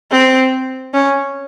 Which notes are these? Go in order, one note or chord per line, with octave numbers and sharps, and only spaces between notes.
C4
C#4